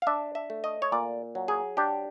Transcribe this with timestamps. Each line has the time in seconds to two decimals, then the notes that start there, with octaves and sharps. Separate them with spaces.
0.02 F5
0.07 D4 E5
0.35 E5
0.50 A3
0.64 D#5
0.82 C#5
0.92 A#2 D5
1.35 F#3
1.48 G#4
1.77 D4 G4